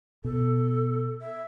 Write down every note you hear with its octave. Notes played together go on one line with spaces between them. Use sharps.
B2 A4
E5